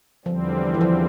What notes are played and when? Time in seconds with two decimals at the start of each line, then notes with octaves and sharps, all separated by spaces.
0.25 E2 D3 F3 G3 C4
0.74 E3
0.81 F3